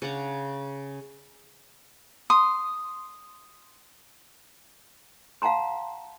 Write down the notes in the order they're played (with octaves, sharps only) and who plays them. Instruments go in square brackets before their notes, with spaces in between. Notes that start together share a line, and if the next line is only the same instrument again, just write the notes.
[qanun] C#3 D4 F#5 A#5
[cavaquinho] C6 D#6
[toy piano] F5 F#5 A5 A#5 C6